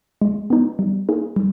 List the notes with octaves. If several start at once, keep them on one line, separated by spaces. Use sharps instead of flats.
G#3
B3 D#4
G3
A#3 D#4 G#4
G3